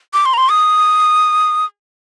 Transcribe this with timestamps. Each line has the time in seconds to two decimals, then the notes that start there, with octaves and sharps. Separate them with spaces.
0.13 D6
0.25 C6
0.34 A#5
0.38 C6
0.50 D#6